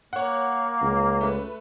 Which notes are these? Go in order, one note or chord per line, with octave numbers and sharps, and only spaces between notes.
A#3 C#5 F#5
C#2
A3 B4